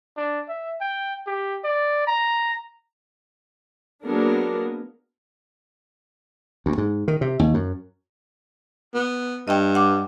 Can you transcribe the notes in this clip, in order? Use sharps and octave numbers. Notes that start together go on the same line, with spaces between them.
D4
E5
G5
G4
D5
A#5
F#3 A#3 B3 D4 G#4 A#4
D2
G#2
D#3
C3
D#2
F#2
B3
G2 D#5 G5
F#5 D6